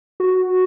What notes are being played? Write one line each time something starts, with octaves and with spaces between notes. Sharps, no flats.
F#4